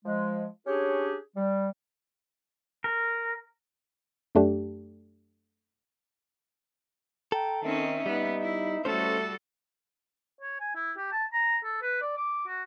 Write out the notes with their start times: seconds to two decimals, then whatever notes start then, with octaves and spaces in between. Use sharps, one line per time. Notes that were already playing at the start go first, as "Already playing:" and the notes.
0.05 F3 G#3
0.67 C#4 D4 G4 G#4 C#5
1.37 G3
2.84 A#4
4.35 F#2 A3 D4 G4
7.32 A4 G5 A#5
7.63 D#3 C4 C#4 D#4 E5
8.06 G3 B3 D#4
8.41 E4
8.85 G3 A3 C#4 F#4 A4 C5
10.41 C#5
10.60 G#5
10.75 E4
10.97 G4
11.12 A5
11.33 A#5
11.64 A4
11.82 B4
12.01 D5
12.17 D6
12.47 F#4